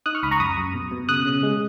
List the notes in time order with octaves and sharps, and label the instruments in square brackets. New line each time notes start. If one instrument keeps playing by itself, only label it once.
[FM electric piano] D#4 D#6 F#6
C#6 F6
C#2 B5 D#6
A#5 C#6
F#2 B5 D#6
F#2
B2
B2
C#3 D#6 F#6
C#3
G#3